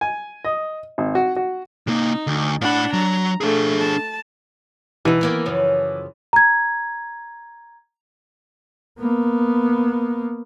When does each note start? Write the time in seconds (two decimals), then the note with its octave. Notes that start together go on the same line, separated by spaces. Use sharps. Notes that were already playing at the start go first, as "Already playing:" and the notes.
0.01 G#5
0.45 D#5
0.98 G#1
1.15 F#4
1.36 F#4
1.87 C3 A#3 D#4
2.27 D2
2.61 A2 D4 F#5 B5
2.93 F#3 A#5
3.41 A3 D4 G#4
3.80 A5
5.05 B2 E3 D#4
5.21 D#3 A#3 B3
5.46 F#2 C#3 F3
6.33 A#5 G#6
8.99 A#3 B3